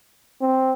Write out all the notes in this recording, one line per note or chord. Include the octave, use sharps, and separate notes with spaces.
C4